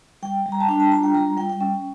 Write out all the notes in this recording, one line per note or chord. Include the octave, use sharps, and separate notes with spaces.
G3 G5
G3
A#5
A5
D4 G5
A5
F4 A#5
G5
G3 A#5
G3 G5
G5
C#4 G5